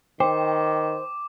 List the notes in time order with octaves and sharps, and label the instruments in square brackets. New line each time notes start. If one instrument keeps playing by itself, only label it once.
[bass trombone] D#3 [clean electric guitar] C5 [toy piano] G5 [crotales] D6